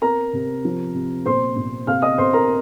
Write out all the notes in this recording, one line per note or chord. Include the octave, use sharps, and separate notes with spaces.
C4 A#4 A#5
C3
F3
C3
A#2 C5 C6
A#2
C3 F5 F6
D#5 D#6
C3 C5 C6
A#4 A#5